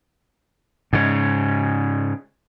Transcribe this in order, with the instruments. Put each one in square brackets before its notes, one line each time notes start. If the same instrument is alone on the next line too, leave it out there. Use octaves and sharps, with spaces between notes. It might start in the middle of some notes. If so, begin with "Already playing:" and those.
[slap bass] G#2 C#3